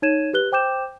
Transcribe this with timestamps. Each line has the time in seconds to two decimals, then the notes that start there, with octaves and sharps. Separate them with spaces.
0.02 D#4 C#5 G#6 D#7 E7
0.33 G4 B4 F#6 G7
0.52 C5 G5 D6 G6 E7